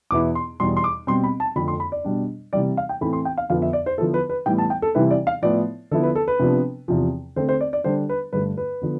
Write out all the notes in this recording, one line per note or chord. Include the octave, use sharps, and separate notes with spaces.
E2 B2 B3 E4 D6
C6
E2 B2 G3 C6
C6
D6
B2 G3 C4 C6
B5
A5
F2 D3 A3 B5
C6
B5
D5
B2 G3 D4
C3 E3 G3 D5
F5
G5
A2 E3 A3 C4 E4 B5
C6
G5
F5
F2 D3 F3 B3 F5
E5
D5
C5
D3 F3 B3 E4 A4
B4
B4
A2 E3 G3 B3 G5
A5
G5
A4
C3 E3 G3 C4 E4 B4
D5
F5
A2 F3 B3 E4 D5
D3 F3 B3 E4 A4
B4
A4
B4
C3 F3 B3 D4
E2 C3 F3
D3 A3 C4 C5
C5
D5
D5
D3 G3 D4 C5
B4
G2 D3 A3 B4
B4
D3 F3 B3